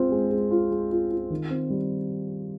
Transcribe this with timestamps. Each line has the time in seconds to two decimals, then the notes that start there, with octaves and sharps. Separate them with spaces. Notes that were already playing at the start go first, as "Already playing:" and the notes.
Already playing: G#3 C4 F4
0.11 G#3
0.31 G#3
0.51 F4
0.71 G#3
0.91 F4
1.11 F4
1.30 D#3
1.50 C4
1.70 G3